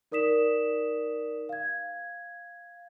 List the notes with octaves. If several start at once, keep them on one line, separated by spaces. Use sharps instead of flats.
D#4 A#4 D5 D#6 B6 E7
F5 G#6